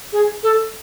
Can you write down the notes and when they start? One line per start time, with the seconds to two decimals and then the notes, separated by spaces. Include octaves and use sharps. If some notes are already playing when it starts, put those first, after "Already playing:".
0.12 G#4
0.43 A4